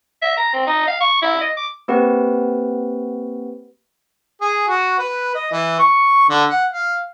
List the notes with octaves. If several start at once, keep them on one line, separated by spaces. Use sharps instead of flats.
E5
A#5
C4
D#4
F5
C#6
E4
D#5
D6
A#3 C4 G4 B4 F#5
G#4
F#4
B4
D#5
E3
C#6
D3
F#5
F5